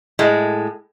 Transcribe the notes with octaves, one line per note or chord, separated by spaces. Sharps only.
A2 G#3